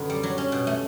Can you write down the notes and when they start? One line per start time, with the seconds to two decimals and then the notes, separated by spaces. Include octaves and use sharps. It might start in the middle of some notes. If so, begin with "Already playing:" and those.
Already playing: F#2 D3 B3
0.10 G3
0.23 F#3
0.38 C#4
0.52 B2
0.67 A3